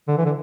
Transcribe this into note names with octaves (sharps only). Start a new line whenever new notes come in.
D3
E3
D3